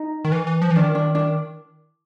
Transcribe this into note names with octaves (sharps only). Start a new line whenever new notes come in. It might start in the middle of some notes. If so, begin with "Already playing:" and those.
Already playing: D#4
D#3
E3
E3
F3
E3
D#3 D4
D4
D4